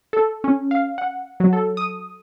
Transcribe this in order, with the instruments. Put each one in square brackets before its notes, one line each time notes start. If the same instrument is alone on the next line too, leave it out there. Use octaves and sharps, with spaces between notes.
[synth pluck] A4
C#4
F5
F#5
F#3
A4
D#6